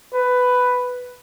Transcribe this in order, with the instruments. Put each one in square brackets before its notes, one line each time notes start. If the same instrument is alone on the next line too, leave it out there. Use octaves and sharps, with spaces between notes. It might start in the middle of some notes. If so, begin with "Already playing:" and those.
[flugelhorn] B4